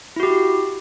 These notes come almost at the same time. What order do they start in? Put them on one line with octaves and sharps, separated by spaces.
E4 F#4 G4